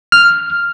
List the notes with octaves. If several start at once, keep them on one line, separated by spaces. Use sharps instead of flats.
F6